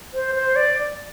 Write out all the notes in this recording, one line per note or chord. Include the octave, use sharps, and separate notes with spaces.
C5
C5
D5